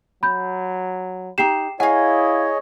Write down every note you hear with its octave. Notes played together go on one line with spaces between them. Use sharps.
F#3 B5 G6
D#4 G4 G5 C7 E7
E4 G#4 C#5 D#5 F5 F#5 G#5